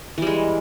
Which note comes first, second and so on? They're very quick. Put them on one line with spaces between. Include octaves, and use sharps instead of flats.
E3 G3 G#3